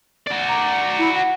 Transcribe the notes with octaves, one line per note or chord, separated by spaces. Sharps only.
F#4 D5
A#5
E4
F#5